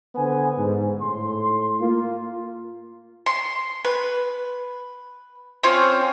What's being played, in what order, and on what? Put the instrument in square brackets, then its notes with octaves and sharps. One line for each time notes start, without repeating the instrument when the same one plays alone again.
[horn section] D3 B3 C5 G#5
G#2
A2 C6
A#3 F4
[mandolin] C6
B4
C4 C#4 F4